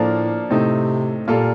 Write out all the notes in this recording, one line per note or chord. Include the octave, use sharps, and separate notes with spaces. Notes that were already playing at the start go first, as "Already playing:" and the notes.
Already playing: A2 F3 A#3 D4 F4 A4
A2 C3 A3 C4 D#4
A#2 G3 A#3 F4 A4